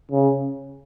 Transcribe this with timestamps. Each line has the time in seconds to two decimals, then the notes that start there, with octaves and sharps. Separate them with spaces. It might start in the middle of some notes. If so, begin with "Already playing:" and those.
0.12 C#3